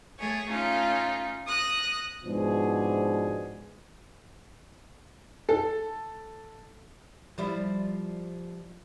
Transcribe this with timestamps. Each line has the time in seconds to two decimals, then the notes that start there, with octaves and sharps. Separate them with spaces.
0.19 A3 G#4 C#5
0.48 A3 C#4 D#4 F4
1.46 D#6 F#6 A#6
2.23 G#2 B2 F3 B3 D4 G#4
5.49 A4
7.38 F3 G3 E4